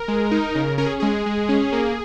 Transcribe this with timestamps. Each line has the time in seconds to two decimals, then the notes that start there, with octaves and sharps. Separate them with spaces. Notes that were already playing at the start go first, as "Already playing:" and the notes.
Already playing: A#4
0.08 G#3
0.31 D#4
0.55 C#3
0.78 C#4 A#4
0.86 G#4
1.00 G#3 G#4
1.26 G#3
1.49 C#4
1.72 A#3